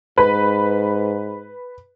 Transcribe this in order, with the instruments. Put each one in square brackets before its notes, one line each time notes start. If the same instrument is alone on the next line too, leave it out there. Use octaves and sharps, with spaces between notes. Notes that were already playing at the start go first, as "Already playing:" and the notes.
[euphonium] G#2 [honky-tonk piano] B4